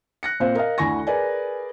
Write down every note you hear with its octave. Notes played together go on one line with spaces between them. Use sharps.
F#6 A#6 C#7
A#2 C4 C5 F5
A#4 D#5 F5
D2 D3 E4 G#5 C#6 A#6
G#4 A#4 B4 D5 G#5